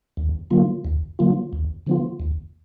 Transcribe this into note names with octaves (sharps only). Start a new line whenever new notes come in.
D#2
D3 F#3 A#3 F4
D#2
D3 F#3 A#3 F4
D#2
D3 F3 B3 F4
D#2